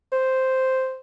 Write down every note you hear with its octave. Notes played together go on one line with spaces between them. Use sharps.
C5